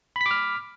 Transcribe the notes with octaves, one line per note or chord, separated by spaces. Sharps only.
B5 D6 F6 B6